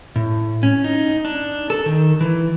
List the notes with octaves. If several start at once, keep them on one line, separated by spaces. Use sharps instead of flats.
A2
C#4
D#4
D4
A4
D#3
E3